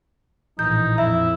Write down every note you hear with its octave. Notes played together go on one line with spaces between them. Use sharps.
A#1 A2 E3 D#4 G6
F2 E4 E5